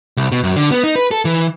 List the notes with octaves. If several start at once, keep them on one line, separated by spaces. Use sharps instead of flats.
C2
B2
F#2
D3
B3
D#4
B4
A4
E3